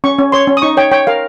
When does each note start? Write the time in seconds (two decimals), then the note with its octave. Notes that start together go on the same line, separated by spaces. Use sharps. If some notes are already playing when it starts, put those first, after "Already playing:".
0.04 C#4 C#6
0.18 C#4
0.32 C#5 C6
0.47 C#4
0.57 D#6
0.62 D#4 C#6
0.77 C#5 G5
0.92 C#5 G5
1.07 A#4 F5